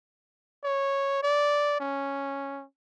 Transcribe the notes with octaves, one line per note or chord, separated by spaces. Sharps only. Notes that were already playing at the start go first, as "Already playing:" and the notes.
C#5
D5
C#4